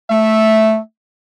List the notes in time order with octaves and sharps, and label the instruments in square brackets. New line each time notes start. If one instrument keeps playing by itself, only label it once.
[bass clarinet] A3 [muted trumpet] E5